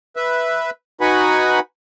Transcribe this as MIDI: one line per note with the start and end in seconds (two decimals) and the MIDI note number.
0.16 0.70 71
0.16 0.70 76
1.01 1.59 63
1.01 1.59 66
1.01 1.59 71
1.01 1.59 78
1.01 1.59 80
1.01 1.59 83